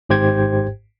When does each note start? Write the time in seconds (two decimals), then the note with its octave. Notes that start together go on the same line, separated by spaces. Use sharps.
0.09 G#1 G#2 G4 C5 G5 G#6